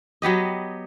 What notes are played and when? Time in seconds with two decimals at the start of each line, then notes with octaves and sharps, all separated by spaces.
0.22 F#3 B3 G4 D#5